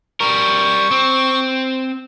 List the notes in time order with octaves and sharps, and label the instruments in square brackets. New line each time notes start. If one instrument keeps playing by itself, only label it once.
[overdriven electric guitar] G3 A#4 [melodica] C#6
[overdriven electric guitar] C4